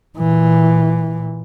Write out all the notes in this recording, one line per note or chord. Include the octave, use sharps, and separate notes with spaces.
A#2 E3